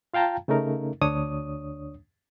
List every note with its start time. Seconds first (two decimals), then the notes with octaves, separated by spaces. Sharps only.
0.14 F4 F5 G5 A5 A#5
0.48 C#3 A3 C#4 D#4 A#4
1.01 D2 D4 C#5 D#6